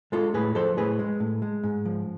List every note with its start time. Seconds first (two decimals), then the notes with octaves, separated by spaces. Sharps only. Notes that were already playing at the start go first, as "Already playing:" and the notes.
0.12 G#3 F4 A4
0.34 A2 G#4 B4
0.55 F3 A4 C5
0.77 A2 G#4 B4
0.99 G#3
1.20 A2
1.42 G#3
1.64 G#2
1.85 F3